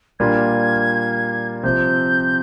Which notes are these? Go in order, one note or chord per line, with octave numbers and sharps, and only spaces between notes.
A#2 G3 A#3 D4 F4 G#6
C3 F3 C4 G6